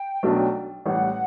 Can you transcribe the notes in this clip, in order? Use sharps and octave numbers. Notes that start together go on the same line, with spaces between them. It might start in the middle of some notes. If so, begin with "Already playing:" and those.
Already playing: G5
B1 B2 F#3 A3 D4
A1 A2 G3 F#5